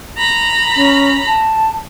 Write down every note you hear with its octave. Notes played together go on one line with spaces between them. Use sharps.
A#5 B5
C#4
A5